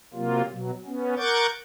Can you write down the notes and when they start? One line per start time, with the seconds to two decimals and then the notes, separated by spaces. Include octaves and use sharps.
0.14 C3 F#3 A#3 F4
0.49 B2 F#3
0.85 B3 C#4
1.17 A#4 F#5 C#6 D6 G6 A6